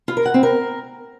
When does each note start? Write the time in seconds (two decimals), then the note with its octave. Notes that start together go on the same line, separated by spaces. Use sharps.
0.08 F4
0.17 A#4
0.25 F#5
0.34 C4
0.43 A#4